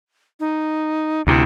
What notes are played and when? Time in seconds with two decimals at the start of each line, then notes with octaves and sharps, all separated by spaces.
0.40 D#4
1.27 D2 C3 E4